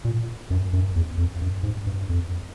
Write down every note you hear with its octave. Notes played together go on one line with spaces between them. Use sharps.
A#2
F#2
F#2
E2
F2
F#2
G#2
G2
F2